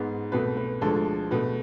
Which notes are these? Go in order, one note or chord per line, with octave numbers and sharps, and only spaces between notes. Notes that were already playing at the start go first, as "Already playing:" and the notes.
Already playing: G#2 G#3 B3
C2 B2 A3 B4
B4
D2 D3 F3 G#3 A4
B2 A3 B4